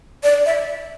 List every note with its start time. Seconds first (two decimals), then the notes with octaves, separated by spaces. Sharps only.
0.23 D5
0.46 E5